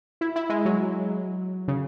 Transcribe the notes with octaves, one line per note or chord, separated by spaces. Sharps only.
E4
E4
G#3
F#3
C#3